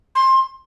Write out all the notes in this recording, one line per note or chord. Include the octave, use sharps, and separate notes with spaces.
C6